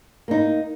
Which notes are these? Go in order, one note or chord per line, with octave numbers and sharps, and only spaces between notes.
A#3 D#4